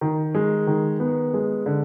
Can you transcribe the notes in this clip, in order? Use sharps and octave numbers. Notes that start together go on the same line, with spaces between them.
D#3
G#3
D#3
B3
G#3
D3